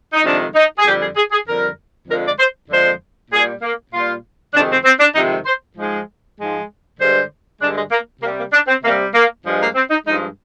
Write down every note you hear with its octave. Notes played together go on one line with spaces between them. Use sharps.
D#4
F2 C3 D#3 G#3 D4
D#4
G#4
F2 D3 G3 G4
G#4
G#4
G#4
F2 D3 G3 A#4
F2 D3 F3 G#3 A#4
D5
C5
F2 D3 F3 G#3 C5
A#2 G3 G#4
A#3
A#2 G3 F4
F2 C3 D#3 G#3 D4
C4
C4
D4
F2 C3 D#3 G#3 D#4
C5
G#2 F3 G#3
G#2 F3 G#3
G2 D3 G#3 C5
G2 D3 G#3 D4
G#3
A#3
C3 G3 A#3
A#3
D4
C4
C3 G3 A#3
A#3
G2 F3 G#3
A#3
C4
D#4
G2 F3 G#3 D#4